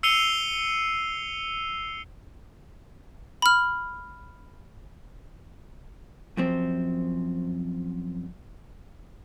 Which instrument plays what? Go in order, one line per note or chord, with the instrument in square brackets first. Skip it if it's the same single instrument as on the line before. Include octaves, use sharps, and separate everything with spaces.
[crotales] E6 C7 C#7 D#7 F7 G7
[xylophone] B5 F6
[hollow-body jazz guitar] F#2 F3 C4